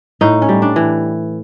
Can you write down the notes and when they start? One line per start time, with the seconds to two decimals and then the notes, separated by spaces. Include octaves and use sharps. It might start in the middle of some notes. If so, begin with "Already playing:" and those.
0.21 A2 D#4
0.42 C#4
0.49 G3
0.62 D4
0.76 E3